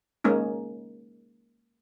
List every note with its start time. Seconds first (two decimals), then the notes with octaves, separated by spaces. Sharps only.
0.24 G#3 A#3 C#4 D#4